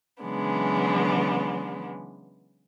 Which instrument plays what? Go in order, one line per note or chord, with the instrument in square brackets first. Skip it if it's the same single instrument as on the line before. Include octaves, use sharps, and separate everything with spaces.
[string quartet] C#3 E3 F#3 G#3 B3 D4